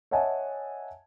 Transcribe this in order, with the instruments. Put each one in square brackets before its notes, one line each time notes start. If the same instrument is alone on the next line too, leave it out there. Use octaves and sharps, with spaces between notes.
[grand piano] C#5 D#5 E5 F#5 G#5 A5